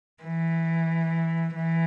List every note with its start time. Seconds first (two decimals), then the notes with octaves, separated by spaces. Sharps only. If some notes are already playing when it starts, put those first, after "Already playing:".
0.23 E3
1.55 E3